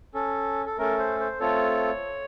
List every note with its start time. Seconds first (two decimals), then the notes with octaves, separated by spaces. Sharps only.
0.14 C#4 A4
0.66 A4
0.78 A3 C#4 A4 A#4
0.98 C5
1.20 C5
1.40 A3 C4 F4 A4 C#5